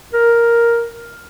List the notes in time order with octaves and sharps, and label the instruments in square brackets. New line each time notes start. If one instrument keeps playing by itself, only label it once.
[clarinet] A#4